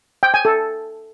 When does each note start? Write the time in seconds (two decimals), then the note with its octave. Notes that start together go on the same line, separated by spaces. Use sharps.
0.23 G5
0.34 G#5
0.45 A4